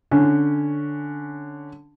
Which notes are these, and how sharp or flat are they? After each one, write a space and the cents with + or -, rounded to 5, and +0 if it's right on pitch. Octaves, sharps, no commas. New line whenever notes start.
D3 +0 C#4 +0